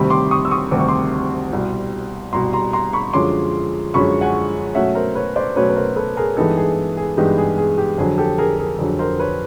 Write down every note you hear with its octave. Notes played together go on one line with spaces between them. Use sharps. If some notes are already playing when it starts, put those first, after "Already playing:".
Already playing: D2 C3 D#3 G3 C4 B5 C#6
C6 D6
C#6 D#6
E6
C#6 D#6
D2 C3 D#3 G3 C4 D6
C#6
C6 D6
C2 B2 G3
C2 B2 G3 A#5 C6
A#5 C6
A#5 C6
B5 C#6
F#2 D3 F3 G#3 C#4 C6 D6
F#2 D3 F3 G#3 C#4 B5 C#6
F#5 G#5
B2 F#3 A3 C#4 E5 F#5
A#4 C5
B4 C#5
C5 D5
B2 F#3 A3 C#4 B4 C#5
B4
A#4 C5
A4 B4
G#4 A#4
G2 E3 G#3 B3 D#4 G4 A4
G#4
G#4
G2 E3 G#3 B3 D#4 G4
G#4
G#4
G4
F2 D3 F#3 G#4
G4 A4
G#4 A#4
G#4 A#4
F2 D3 F#3 G#4
A#4 C5
B4 C#5